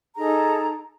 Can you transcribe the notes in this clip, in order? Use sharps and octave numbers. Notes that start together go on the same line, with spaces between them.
D#4 G#4 A4 A#5